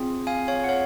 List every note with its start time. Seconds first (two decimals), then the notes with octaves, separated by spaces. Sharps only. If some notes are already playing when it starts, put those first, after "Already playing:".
Already playing: C4 F4 G#4
0.27 F5 G#5
0.48 C#5 F5
0.64 F#5
0.69 C#5 F5